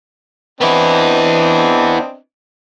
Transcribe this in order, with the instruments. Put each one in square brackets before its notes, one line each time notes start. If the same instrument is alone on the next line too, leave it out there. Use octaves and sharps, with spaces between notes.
[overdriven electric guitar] B3 E4 [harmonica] C4 D4 D#5